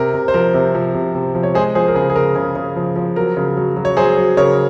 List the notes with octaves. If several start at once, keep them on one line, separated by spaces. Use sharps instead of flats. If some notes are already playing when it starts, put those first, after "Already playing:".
Already playing: C3 A#4
C3
C5
F3 A#4
C3
F3
C3
C3
F3
C#5
G#3 G#4 C5
F3 G#4 C5
A#4
C#3 G#4
G#4
C#3 A#4
C#3 G#4
C#3
F3
F3
F#3 A#4
C#3
F#3
F#3
C#5
F#3 G#4 C5
F#3
C#3 A#4 C#5